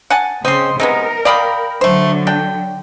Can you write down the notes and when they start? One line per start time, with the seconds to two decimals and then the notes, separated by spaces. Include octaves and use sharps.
0.10 F#5 G#5 A5
0.45 C#3 C4 D#5 C6
0.80 C3 G#3 B3 D#4 A#4
1.25 D5 F5 G5 B5 D#6
1.81 D3 F#3 A3 C5
2.27 D4 G5